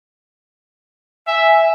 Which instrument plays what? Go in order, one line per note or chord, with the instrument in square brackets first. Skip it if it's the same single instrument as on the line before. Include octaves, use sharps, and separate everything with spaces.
[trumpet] E5 [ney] G#5